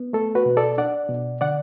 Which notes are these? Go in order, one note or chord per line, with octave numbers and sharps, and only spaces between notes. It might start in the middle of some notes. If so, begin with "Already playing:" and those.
Already playing: B3
A3 A4
F#4 B4
B2
A4 D5
D4 D5 F#5
B2
D3 D5 F#5